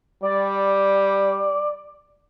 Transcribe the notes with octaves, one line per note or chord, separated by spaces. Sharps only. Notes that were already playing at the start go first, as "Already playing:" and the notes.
G3 D5